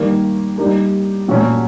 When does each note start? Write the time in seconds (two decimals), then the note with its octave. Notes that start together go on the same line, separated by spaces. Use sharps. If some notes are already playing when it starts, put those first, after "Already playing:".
Already playing: D#3 G3 A#3
0.57 G3 A#3 D#4 G4
1.28 A#2 F#3 A3 C#4